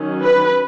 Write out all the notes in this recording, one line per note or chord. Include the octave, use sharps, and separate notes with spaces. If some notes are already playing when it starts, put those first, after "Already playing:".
Already playing: D#3 F#3 C#4
B4